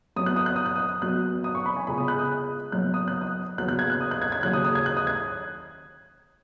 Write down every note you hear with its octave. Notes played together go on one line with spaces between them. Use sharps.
F#2 F#3 B3 D#6
F#6
D#6
F#6
D#6
F#6
D#6
F#2 F#3 B3 F#6
D#6
C#6
B5
G#5
C#2 C#3 G#3 B3 B5
D#6
F#6
D#6
F#1 F#2 F#3 B3 F#6
D#6
F#6
D#6
D#2 C#3 F#3 B3 F#6
F#6
G#6
F#6
D#6
F#6
G#6
G#6
D#2 C#3 F#3 F#6
D#6
D#6
G#6
F#6
D#6
G#6